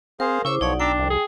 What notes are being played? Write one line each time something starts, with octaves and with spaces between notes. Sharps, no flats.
C4 G#4 A#4 C5 F5
C#3 E4 C5 C#6 D6 E6
B1 F3 D#4 C#5 D5 F#5
D4 G5 A#5 D6 E6
C2 F2
G#4